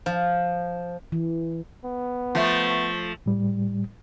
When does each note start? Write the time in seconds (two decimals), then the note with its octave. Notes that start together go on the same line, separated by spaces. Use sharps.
0.06 F3
1.12 E3
1.84 B3
2.35 F3 A3
3.26 A2 G3